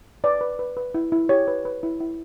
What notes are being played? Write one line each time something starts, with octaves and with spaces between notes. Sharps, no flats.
B4 D5
B4
B4
B4
E4
E4
G4 C#5
B4
B4
E4
E4